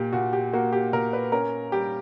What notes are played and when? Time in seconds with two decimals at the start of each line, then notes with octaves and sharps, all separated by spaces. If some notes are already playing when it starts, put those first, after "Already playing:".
Already playing: A#2 G4
0.13 A#2 F#4
0.33 G4
0.53 A#3 F#4
0.73 G4
0.93 A#2 A#4
1.13 B4
1.32 C#4 A#4
1.72 G3 G4